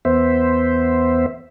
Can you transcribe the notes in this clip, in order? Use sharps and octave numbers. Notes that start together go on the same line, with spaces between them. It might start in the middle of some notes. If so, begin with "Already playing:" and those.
E2 B3 C5 E5